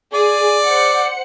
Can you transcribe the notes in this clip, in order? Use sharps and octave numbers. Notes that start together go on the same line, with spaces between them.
G#4 D5
C5 F#5 C#7